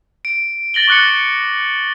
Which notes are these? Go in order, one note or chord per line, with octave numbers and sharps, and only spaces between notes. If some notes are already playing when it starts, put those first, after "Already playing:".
D7
A6 A#6 F#7 G7
C#6 D6 F#6 A#6 C#7